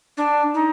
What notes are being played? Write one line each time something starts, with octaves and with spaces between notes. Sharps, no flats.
D4
D#4